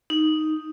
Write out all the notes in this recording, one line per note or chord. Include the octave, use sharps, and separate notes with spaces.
D#4